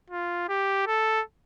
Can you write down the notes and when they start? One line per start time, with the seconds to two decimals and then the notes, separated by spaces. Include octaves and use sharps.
0.10 F4
0.48 G4
0.87 A4